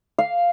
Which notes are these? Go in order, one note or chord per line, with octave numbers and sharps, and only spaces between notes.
F5